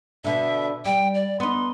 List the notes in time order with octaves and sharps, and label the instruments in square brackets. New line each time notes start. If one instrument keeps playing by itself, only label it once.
[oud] B2 D3 [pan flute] E5
[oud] G3 [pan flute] G5
[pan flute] D5
[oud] B3 D#4 [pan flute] C6